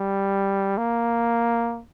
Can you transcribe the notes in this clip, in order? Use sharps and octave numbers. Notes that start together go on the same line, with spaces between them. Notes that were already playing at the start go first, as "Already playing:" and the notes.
Already playing: G3
A#3